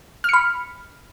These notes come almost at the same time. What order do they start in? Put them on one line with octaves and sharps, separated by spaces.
F6 C#7 B5